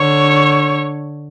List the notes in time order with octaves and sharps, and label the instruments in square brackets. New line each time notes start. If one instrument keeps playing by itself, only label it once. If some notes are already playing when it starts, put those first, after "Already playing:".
Already playing: [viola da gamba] D3 [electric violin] C#5